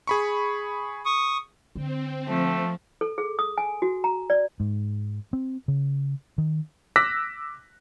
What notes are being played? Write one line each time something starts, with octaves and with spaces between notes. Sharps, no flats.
G#4 B5 C#6
C#6 D#6
D3 C4
F3 A3
A4
G#4
D#6
G#5
F#4
A#5
D5
G#2
C4
C#3
D#3
D6 E6 F#6 A#6 B6